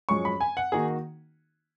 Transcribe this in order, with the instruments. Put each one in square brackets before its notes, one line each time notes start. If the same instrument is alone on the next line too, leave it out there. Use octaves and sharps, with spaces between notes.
[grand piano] F#2 F3 G#3 C#4 [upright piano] C#6
[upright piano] B5
G#5
F#5
[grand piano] D#3 A#3 D#4 F#4 [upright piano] G#4